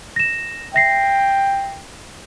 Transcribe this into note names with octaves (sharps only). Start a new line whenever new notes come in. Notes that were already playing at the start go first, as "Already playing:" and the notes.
A#6 E7
E5 G5 A#6 C7